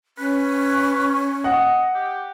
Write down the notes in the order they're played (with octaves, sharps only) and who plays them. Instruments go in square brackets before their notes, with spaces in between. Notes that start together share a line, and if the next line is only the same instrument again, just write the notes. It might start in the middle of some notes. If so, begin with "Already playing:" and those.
[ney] C#4 [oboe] B4
[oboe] D#5 [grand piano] F#5
[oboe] G4